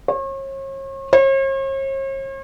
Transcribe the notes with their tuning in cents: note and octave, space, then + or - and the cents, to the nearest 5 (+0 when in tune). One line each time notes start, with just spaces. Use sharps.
C#5 -40
C#5 -45